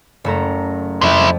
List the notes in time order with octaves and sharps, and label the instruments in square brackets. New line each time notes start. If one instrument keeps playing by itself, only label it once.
[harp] F#1 A3 A#5
[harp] F2 [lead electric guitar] C3 E4